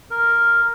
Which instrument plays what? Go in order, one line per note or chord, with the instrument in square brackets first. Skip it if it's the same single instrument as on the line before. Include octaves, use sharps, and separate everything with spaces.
[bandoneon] A#4